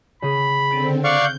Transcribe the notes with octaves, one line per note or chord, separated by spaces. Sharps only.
C#3 G#4 B5
D3 C4 A6 D7 D#7
D5 F5 F#5 C#6 G6